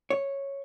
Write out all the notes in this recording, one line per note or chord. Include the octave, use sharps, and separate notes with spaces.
C#5